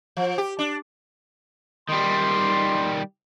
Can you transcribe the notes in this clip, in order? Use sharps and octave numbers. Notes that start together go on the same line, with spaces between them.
F3
G4
D4
D#3 G3 C6